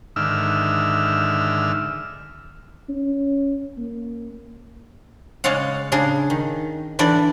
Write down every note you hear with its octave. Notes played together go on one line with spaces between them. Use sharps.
G#2 D3 D#3 E5 E6 F6
C#4
A#3
C#3 G#3 C#5 D5 F5 F#5
C#3 D4 G#4
D#3
D3 E3 D4 D5